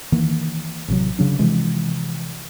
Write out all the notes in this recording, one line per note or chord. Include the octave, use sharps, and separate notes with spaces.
D#3 E3 A#3
A1 C3 F#3
C#3 F#3 D4
C3 E3 F3 G#3